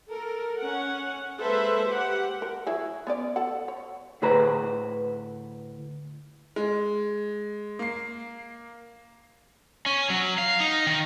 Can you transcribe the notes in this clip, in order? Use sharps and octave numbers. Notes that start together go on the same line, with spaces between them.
A4 A#4
C#4 F#5
G#3 A#3 A4 B4 C5 E5
G4 F#5
A#4
F#3 E4 G#4
B3 C#4 D5
A4 F#5
C#5
D2 A2 G#4 B4 C5 A#5
G#3
A#3 C7
C#4
F#3
F5
D#4
D#3